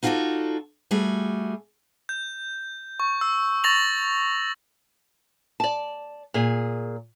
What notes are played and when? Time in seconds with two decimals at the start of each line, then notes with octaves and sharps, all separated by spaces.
0.03 D#4 F4 F#4 G#4 A4 D5
0.91 G3 A3 F#4 G#4
2.09 G6
3.00 C#6
3.21 E6
3.64 C#6 A6 A#6 F7 F#7
5.60 D5 A5
6.34 A#2 G#4